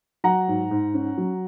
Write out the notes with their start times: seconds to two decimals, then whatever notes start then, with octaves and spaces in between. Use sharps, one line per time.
0.24 F#3 F#5 A#5
0.48 G#2
0.71 G#2
0.94 C#4
1.18 F#3